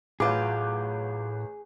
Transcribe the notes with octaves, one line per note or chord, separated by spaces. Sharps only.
A1 A2 F#3 F4 G#4 B4 D6